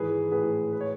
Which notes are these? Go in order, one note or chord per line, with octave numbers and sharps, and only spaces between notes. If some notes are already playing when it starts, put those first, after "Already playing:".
Already playing: G#2 D#3 E3 G#4 B4
A2 G#4 B4
B4
C#5